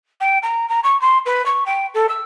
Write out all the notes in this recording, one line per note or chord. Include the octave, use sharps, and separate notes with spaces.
G5
A#5
A#5
C#6
C6
B4
C#6
G5
A4
E6